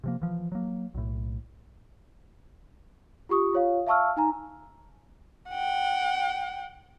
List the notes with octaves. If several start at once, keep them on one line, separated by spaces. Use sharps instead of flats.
C3 F3 A#3
E3 F3
F#3 A#3
B1 A2
F4 G4 C#6 D#6
F4 C#5 F5
E5 F5 A5 C#6 E6 F6
D#4 G#5 A#5
F#5 G5